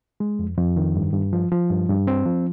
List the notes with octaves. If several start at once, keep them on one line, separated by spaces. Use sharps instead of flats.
G#3
F2
F2
D#3
G2
G2
F3
F3
G2
G2
C4
F3